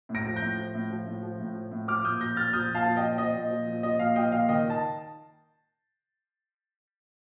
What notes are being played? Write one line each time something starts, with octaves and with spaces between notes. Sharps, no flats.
A2
A#6 D7
F3
G6 A#6
A2
F3
A2
F3
A2
F3
A2
F3
A2
F3 D6 F6
A#2 D#6 G6
F3 G6 A#6
A#2 F6 A6
F3 D#6 G6
A#2
F5 A5
F3
D#5 G5
A#2
F3 D#5
A#2
F3
A#2
F3 D#5
A#2 F5
F3 D#5 G5
A#2 F5
D#3 D#5 G5
A5